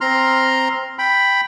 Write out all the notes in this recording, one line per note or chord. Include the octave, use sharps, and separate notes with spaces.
C4 A#5 C6 F6
G5 B5